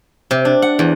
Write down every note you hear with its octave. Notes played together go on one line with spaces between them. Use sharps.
C3
D4
F#5
E2